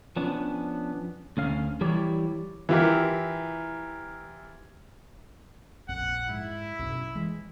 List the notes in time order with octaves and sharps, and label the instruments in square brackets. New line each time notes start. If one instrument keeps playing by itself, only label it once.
[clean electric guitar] F3 B3 C#4 D4
D2 C#4 F5
E3 G3 E4 G4 C#5 D5
[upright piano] E3 E4 F4 G4 A#4
[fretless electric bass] A#1 F2 [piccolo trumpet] F#5
[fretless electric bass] G#2 [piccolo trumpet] E4
[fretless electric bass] B1 F#2
E3 G#3